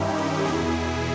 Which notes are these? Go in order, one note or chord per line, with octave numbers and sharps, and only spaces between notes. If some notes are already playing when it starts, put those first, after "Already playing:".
Already playing: G2 D#3 C#4 D#4 E4 G4
D#4 G4
E2 B2 E4 G#4